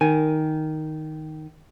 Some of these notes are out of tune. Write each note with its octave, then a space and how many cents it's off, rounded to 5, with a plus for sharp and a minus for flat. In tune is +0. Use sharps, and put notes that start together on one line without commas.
D#3 +0 G#5 +0